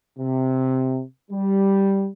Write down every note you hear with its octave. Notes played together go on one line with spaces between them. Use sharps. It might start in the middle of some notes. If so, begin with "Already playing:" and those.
C3
G3